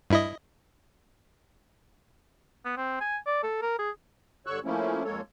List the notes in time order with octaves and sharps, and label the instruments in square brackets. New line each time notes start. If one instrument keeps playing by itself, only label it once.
[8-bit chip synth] G2 E4 D#5
[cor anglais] B3
C4
G#5
D5
A4
A#4
G#4
[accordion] G2 D3 C#5 C#6 E6 F#6
F3 A3 A#3 C#4 E4
F2 G#3 A#3 A4 C#5